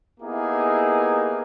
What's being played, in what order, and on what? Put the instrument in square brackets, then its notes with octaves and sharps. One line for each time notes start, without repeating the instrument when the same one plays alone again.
[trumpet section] A#3 B3 D#4 E4 G4 G#4